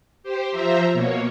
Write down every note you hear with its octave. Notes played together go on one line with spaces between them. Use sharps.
G4 C5
F3 C5 E5 A#5
B2 A#3 C#5